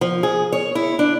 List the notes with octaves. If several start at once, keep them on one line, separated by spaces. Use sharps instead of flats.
F3
G#4
C#5
E4
D4